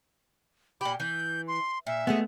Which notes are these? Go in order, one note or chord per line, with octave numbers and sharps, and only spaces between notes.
A#2 G4 B5
E3 G6
C6
A#2 E5
G#3 A3 B3 F#4 D#5